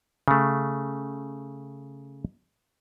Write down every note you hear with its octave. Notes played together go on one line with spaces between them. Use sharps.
C#3 A3